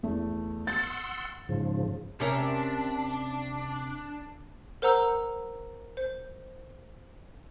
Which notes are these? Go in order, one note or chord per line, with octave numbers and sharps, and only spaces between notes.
E2 A3
F#5 C6 E6 A6
G#2 C#3 F3
C3 C#4 D4 A#4 C5 D5 E5
A#4 C5 F#5 A#5 E6
C5